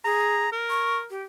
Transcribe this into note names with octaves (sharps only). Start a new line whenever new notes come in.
G#4 A#5
A#4
C#6
G4